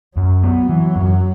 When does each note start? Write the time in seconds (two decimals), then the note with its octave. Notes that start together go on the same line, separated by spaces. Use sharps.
0.17 F#2 F#3
0.43 B3
0.69 E3
0.96 F#2